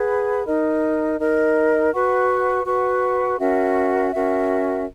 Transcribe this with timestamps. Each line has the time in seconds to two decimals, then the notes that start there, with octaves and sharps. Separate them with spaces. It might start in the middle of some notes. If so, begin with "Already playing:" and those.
Already playing: G#4 B4 F#5 B5
0.46 D#4 A#4 D#5
1.19 D#4 A#4 D#5
1.93 F#4 B4 F#5 C#6
2.65 F#4 B4 F#5 C#6
3.39 C#4 F#4 A#4 E5
4.12 C#4 F#4 A#4 E5